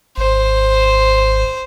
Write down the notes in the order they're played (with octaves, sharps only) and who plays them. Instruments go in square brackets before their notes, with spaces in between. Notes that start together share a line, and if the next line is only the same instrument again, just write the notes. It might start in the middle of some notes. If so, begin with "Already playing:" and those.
[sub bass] G#1 [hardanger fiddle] C5